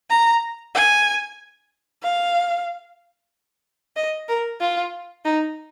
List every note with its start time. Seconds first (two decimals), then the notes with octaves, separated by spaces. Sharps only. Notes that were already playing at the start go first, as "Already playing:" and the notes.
0.10 A#5
0.75 G#5
2.03 F5
3.96 D#5
4.28 A#4
4.60 F4
5.25 D#4